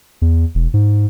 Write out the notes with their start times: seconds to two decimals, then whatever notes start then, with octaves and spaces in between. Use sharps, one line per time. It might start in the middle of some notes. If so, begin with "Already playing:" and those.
0.22 E2
0.55 E1
0.74 G#2